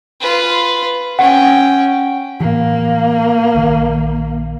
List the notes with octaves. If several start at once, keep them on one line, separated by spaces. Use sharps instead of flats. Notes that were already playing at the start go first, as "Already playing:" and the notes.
F4 B4
C#4 F#5 G5
A2 E3 A#3
A#1 D#3